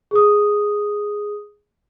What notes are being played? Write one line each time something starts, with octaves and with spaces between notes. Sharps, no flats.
G#4 D#6